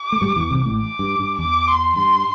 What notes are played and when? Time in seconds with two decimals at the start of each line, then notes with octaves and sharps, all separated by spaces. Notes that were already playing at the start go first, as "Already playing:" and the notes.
Already playing: D6
0.12 A3
0.21 G2 G3
0.36 E2 E3
0.51 C2 C3
0.65 A1 A2
0.80 D6
0.99 G2
1.19 G2
1.39 E2 D6
1.67 C6
1.96 G2 C6